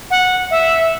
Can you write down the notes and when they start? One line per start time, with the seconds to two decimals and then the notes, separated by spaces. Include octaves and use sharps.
0.11 F#5
0.51 E5